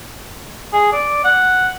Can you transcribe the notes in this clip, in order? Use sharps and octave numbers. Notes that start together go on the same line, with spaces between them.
G#4
D5
F#5